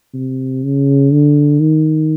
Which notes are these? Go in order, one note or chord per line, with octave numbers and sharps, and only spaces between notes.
C3
C#3
D3
D#3